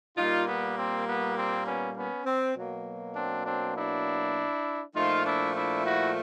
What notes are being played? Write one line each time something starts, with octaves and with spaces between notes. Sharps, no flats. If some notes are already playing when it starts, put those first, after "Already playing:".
A#2 G3 A#3 D#4 F4
B3
C4
B3
C4
B3 C#4
B3 C#4
C4
B2 F#3 A#3
C4 D4
C4 D4
D4 E4
A#2 F3 A3 D#4 F4
D4 E4
D4 E4
E4 F#4